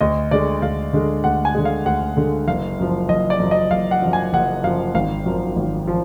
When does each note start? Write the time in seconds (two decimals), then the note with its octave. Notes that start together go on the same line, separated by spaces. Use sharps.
0.01 D2 D#5
0.31 D3 G#3 D5
0.62 D2 F5
0.93 D3 G#3
1.24 D2 F#5
1.45 G#5
1.55 D3 G#3
1.65 F5
1.86 D2 F#5
2.17 D3 G#3
2.47 F#1 F5
2.79 F#2 F3
3.09 F#1 D#5
3.30 D5
3.40 F#2 F3
3.51 D#5
3.71 F#1 F5
3.91 F#5
4.02 F#2 F3
4.13 G#5
4.33 F#1 F#5
4.64 F#2 F3 F5
4.94 G#1 F5
5.26 F#2 F3
5.56 G#1
5.88 F3